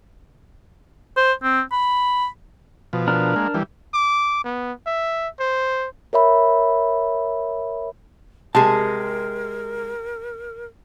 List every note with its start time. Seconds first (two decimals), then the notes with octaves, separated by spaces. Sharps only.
1.17 C5
1.43 C4
1.72 B5
2.93 B2 F3
3.08 D4 A#4
3.36 G#3 A#3
3.54 E3 G3
3.94 D6
4.44 B3
4.86 E5
5.39 C5
6.13 A#4 C#5 E5 B5
8.55 C3 G#3 G#4 A#4 A5